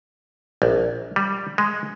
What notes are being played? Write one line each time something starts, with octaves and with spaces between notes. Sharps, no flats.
A#1
G3
G#3